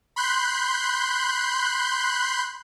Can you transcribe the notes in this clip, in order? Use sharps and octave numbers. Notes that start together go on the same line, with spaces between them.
B5 C6 F#6 G6